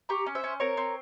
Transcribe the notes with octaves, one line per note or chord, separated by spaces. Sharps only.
G4 A#5 C#6
C#4
C5 E5
C#4
C4 A#4 C#5
C4